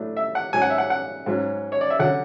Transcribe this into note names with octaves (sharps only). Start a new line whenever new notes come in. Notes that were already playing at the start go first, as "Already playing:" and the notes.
Already playing: A2 F#3 A3 D4
E5
F#5
G#2 F#3 C#4 G#5
F#5
E5
F#5
F#5
G#2 F#3 C#4
C#5
D5
E5
D3 F#3 C#4 F#5